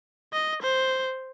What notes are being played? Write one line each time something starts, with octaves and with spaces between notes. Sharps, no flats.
D#5
C5